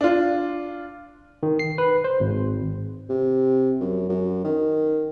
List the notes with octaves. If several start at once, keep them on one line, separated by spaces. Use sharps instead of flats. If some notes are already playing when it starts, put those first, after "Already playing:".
D4 F4
D#3
C7
B4
C5
G#1
C3
F#2
F#2
D#3